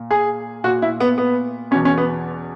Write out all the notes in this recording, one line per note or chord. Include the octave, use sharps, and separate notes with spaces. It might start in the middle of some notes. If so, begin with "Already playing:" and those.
Already playing: A#2
G#4
A#2 F#4
E4
B3
B3
E2 B2 C#4
C#4
B3